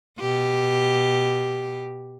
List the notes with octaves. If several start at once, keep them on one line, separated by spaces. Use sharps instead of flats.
B2 G4